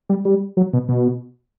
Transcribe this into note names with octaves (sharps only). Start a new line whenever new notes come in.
G3
G3
F#3
B2
B2